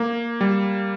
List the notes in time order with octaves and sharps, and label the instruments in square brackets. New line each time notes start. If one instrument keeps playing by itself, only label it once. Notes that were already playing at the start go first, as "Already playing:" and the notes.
Already playing: [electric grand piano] A#3
G3